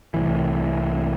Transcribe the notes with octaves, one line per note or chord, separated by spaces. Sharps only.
C2 A2 E3